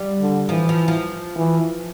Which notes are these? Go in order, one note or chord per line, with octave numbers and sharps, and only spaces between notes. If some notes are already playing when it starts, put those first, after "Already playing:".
Already playing: G3
D3
E3 F3
F3
F3
E3